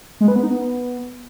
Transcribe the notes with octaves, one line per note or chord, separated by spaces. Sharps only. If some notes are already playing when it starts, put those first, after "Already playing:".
G#3
B4
B3
D#4
B3